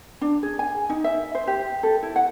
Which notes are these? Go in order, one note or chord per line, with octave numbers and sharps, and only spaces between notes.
D4
G#4
G#5
D#4
E5
C5
G4
A4
E4
F#5